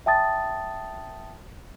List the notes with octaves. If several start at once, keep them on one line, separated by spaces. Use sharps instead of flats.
E5 G5 A5 D#6 A6